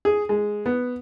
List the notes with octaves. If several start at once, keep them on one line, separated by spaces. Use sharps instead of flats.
G#4
G#3
B3